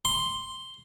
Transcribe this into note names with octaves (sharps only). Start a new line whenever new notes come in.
C6